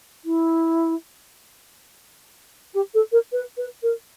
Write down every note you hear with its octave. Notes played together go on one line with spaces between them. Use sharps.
E4
G4
A4
A#4
B4
B4
A#4